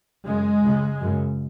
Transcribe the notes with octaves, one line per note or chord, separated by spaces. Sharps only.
F#2 C#3 G#3
C#2 C#3
F#2 C#3